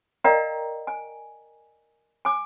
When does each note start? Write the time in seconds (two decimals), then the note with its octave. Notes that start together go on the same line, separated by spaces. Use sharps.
0.24 A#4 D5 D#5 F5 G5 A#5
0.87 G#5
2.25 G#5 D6